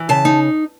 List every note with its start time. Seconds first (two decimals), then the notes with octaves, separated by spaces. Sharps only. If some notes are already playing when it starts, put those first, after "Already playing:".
Already playing: E3
0.09 C#3 A5
0.25 D#4